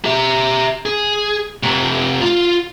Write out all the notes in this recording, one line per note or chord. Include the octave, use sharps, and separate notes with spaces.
G4 E5
G#4
C3 A3
F4